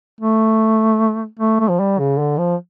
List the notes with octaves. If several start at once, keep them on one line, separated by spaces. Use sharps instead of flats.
A3
A3
A3
F3
G3
C#3
D3
F3